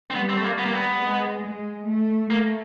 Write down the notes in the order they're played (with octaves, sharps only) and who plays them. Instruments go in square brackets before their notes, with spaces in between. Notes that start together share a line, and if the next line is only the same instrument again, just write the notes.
[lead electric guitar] C4
[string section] G3 [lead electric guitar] B3
[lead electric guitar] C4
A3
A#3
[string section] G3 [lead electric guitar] B3
[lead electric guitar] A#3
B3
[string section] G#3
G#3
A3
[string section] A3 [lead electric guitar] A#3